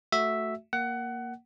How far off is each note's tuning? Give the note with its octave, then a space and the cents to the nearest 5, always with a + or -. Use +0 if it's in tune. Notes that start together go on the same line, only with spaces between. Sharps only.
A3 +0 F#4 +0 E5 +0
A#3 +0 F#5 +20